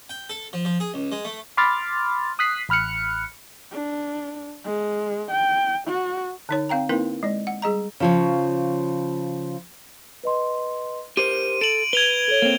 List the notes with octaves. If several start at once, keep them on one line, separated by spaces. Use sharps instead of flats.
G5
A4
F3
F3
G#4
C#2
G#3
A3
B5 C6 D6 F6 A6
D#6 F#6 B6 C7
A1 B5 F6 F#6 C#7
D4
G#3
G5
F#4
D3 D#4 C#5
C4 F5 G5 A#5
A#3 C4 D#4 E4 A#4 B4
G#3 D5
F#5
G3 G#4 D#5 A#5
C#3 F3 C#5
B4 D#5 C6
G4 A#4 C5 C6 D#7
A4 D7 F#7
B4 G#6 F7 G7
A4 C#5
A#3 C4